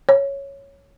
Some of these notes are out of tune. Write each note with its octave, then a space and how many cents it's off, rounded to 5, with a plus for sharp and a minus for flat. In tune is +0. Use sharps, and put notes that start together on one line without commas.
C#5 +0